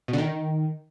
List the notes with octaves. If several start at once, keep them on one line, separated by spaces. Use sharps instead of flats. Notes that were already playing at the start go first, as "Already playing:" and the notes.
B2
D3
D#3